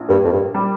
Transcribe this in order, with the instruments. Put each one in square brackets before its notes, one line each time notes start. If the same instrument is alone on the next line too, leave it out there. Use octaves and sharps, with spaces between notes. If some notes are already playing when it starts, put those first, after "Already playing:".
Already playing: [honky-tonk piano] A#1
[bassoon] G2 [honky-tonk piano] A#3
[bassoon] F2
G2
[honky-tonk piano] G3